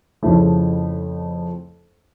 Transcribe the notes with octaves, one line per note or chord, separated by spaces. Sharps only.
F2 C#3 F3 A3 E4